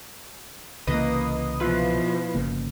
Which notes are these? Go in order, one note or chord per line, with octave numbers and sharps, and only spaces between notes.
C2 C#3 E3 A#3 B4 D#5 D#6
B2 F3 E4 F4 B4
G1 C#3 A#3